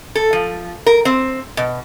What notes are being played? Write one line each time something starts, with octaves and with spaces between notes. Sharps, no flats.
A4
F3
A#4
C4
B2